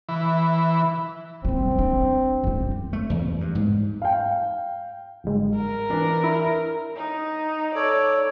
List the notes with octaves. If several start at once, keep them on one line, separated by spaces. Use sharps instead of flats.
E3
D#2 G3 C4
D4
F#2 G3
A3
E2
G2
G#2
F5 G5
G1 G#2
A#4
E3 D4 B4
E4
D#4
A4 C#5 D5